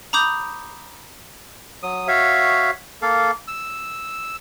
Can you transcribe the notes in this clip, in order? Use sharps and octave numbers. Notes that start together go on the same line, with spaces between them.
A#5 B5 D6 D#6 G6
F#3 D#6
F#4 C#5 E5 F5
A#3 A4 F5
E6